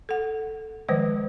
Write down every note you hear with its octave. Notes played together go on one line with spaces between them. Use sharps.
A4 F#5
D#3 F3 G#3 B4 C5 D#5